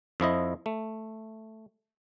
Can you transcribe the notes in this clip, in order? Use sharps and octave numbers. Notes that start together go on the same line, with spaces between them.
F2 F3 E4 D#5
A3